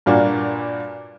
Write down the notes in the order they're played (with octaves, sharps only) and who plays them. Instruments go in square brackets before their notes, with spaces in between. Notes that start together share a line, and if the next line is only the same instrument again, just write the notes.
[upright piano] G2 A#2 A#3 D4 F#4